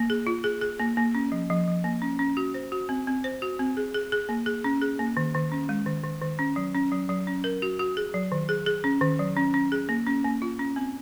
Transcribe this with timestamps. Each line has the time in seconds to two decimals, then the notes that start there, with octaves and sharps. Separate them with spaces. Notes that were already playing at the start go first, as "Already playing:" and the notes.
Already playing: A#3
0.10 G#4
0.27 F4
0.44 G#4
0.61 G#4
0.80 A#3
0.97 A#3
1.15 C#4
1.32 F3
1.50 F3
1.67 F3
1.84 A#3
2.02 C#4
2.19 C#4
2.37 F#4
2.54 C5
2.72 F#4
2.89 C4
3.07 C4
3.24 C5
3.42 F#4
3.59 C4
3.77 G#4
3.94 G#4
4.12 G#4
4.29 A#3
4.46 G#4
4.64 C#4
4.82 G#4
4.99 A#3
5.17 D#3
5.34 D#3
5.52 C#4
5.69 G#3
5.86 D#3
6.04 D#3
6.22 D#3
6.39 C#4
6.56 F#3
6.75 C#4
6.92 F#3
7.09 F#3
7.27 C#4
7.44 A#4
7.62 F#4
7.79 F#4
7.97 G#4
8.14 F#3
8.32 D#3
8.49 G#4
8.66 G#4
8.84 C#4
9.01 D#3
9.19 F#3
9.37 C#4
9.54 C#4
9.72 G#4
9.89 A#3
10.07 C#4
10.24 A#3
10.42 F4
10.59 C#4
10.76 C4